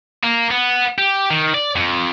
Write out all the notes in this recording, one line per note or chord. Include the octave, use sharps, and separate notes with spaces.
A#3
B3
G4
D#3
D5
F2